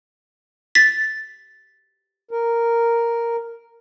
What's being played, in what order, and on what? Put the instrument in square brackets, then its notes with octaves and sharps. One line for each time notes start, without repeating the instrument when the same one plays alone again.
[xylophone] A6 B6
[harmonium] A#4